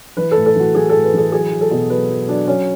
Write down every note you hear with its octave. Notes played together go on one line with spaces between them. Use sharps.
E3 B4
A2 A4
A4
E3 F#4
E3 G#4
A2 A4
B4
E3 A4
F#3 G#4
F#3
A4
B2
F#3 B4
F#3
F#3 D4
F#3 C#4